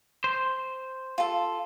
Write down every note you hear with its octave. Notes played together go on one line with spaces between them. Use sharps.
C5
F4 A4